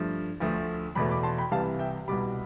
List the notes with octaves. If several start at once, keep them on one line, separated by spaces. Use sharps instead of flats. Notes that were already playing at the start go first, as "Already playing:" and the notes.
Already playing: G2 F3 A3
D2 D3 F3 A3
E2 B2 A3 B5 D6
B5 D6
A5 C6
G5 B5
C2 C3 E3 G3 F5 A5
E5 G5
C2 B2 G3 B5 D6